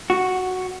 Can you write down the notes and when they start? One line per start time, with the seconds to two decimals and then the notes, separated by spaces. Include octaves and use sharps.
0.10 F#4